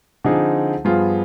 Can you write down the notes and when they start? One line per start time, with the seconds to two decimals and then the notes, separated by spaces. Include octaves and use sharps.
0.24 D3 F3 C4 D#4 G#4
0.85 G2 F3 B3 F4 G#4